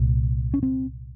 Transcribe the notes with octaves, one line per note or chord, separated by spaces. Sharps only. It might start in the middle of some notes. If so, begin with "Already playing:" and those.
Already playing: C2 A#2
C#4
C4